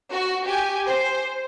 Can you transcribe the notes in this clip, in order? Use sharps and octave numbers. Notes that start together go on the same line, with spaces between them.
F#4
G4 G#5
C5